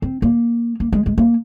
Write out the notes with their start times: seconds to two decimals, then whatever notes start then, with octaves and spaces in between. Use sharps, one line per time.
0.02 C4
0.22 A#3
0.80 A#3
0.92 G#3
1.06 G#3
1.18 A#3